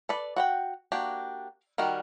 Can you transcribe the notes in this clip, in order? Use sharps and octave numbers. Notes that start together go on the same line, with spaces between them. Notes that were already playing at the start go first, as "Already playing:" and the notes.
A4 B4 D5
F#4 F#5 G5
A#3 D4 F#4 G4
D#3 G3 F#4 A#4